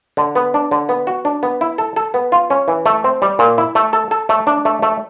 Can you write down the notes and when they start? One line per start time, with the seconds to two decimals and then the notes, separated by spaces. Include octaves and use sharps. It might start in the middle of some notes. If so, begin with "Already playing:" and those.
0.17 D3
0.36 B3
0.54 D4
0.71 D3
0.89 B3
1.07 F#4
1.25 D4
1.43 B3
1.61 E4
1.78 A4
1.96 A4
2.14 B3
2.32 F4
2.50 C#4
2.68 E3
2.86 A3
3.04 C4
3.22 G3
3.39 A#2
3.58 E4
3.75 A3
3.93 A4
4.11 A4
4.29 A3
4.47 D4
4.65 A3
4.82 A3